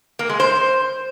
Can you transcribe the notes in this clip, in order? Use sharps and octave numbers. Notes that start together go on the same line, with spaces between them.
A#3
G#3
C5